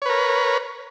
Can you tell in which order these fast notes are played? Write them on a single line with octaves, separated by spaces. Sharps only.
C#5 B4 A#4